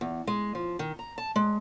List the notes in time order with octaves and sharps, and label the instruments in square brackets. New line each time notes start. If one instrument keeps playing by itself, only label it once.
[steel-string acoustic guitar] E2
G#3
F3
D#3
A#5
A5
G#3